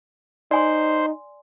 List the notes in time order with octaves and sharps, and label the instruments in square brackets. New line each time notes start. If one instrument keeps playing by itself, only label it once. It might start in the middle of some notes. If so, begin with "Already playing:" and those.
[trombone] D#4 [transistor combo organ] C5 [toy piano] D5 G#5 C6